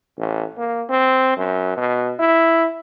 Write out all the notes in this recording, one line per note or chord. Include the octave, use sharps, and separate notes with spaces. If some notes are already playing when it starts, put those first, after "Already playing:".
A1
A#3
C4
F#2
B2
E4